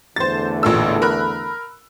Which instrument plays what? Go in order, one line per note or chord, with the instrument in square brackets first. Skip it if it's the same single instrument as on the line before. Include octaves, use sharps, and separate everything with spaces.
[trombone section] E2 D3 A3 [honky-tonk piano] C5 A6
[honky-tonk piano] A1 A#2 E6
A#4 B5 F#6